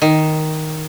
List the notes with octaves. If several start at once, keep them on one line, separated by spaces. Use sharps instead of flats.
D#3